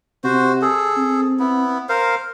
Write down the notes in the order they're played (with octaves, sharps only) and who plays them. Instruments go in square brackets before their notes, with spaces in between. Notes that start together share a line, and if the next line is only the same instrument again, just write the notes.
[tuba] C3 [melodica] F#4 C5
[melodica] G#4 A4
[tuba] C4
[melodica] B3 E4
A#4 C5 F5